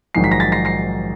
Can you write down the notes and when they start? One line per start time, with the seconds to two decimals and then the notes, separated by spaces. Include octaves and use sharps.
0.15 A#1 G#2 D#3 F#3 C7
0.24 B6
0.32 A#6
0.40 A6 B6
0.52 A#6 C7
0.65 A#6 C7